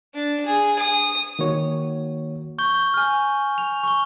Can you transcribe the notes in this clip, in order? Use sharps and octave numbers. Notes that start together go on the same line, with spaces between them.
D4
G#4
D#6
D#3 A#3 F#4 C#5
C#6 G6 G7
G#5 F6
F7
C#6 G7